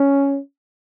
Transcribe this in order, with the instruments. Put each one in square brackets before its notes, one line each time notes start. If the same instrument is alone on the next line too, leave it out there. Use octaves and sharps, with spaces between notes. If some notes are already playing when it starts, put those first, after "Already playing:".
Already playing: [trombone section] C#4